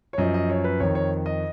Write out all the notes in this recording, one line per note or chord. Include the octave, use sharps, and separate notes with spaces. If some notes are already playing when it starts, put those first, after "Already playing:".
C#5
F#2 F3 D#5
D#5
C#5
B4
F2 D#3 C#5
C#5
D#5